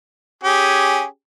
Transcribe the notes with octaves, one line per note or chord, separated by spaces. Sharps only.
C#4 G4 G#4